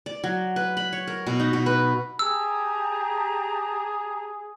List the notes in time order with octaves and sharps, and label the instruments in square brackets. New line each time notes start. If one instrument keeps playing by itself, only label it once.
[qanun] D5
F#3
B4
B5
C#5
A#4
B2
D#4
B2
B4
[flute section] G4 A5 A#5 [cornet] G#4 [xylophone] E6